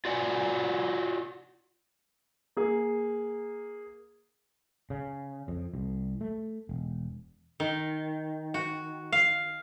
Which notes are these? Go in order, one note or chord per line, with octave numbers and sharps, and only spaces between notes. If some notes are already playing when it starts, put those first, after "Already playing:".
F4 F#4 D5 F#5 G#5
A#3 G#4
C#3
F2
C2
A3
E1
D#3
F#4
F5